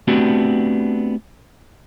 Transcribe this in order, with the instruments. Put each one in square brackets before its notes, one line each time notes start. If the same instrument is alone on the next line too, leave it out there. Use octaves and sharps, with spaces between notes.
[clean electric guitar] A3 B3 C4 D4 F#4 G4